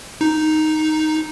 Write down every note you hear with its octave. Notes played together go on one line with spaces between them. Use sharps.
D#4